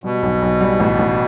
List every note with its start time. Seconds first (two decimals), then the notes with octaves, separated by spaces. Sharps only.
0.04 B2 G3
0.23 B1
0.42 B1
0.61 G3
0.80 A1
0.99 A1